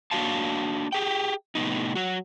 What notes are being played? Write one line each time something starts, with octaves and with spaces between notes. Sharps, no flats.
A#3 D4 F#4 C#5 F5 A5
G4 G#4 G5
A2 C3 B3 D#4
F#3 F#4